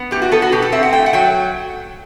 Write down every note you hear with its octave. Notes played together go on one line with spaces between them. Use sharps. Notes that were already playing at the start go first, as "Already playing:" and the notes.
Already playing: B3
A2 G4
F#4
B3 A4
F#4
B2 G4
A4
C4 E5
F#5
A3 G5
F#5
F#3 G5